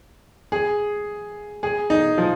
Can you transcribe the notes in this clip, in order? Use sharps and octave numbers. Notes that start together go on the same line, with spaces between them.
G#4
G#4
D#4
F3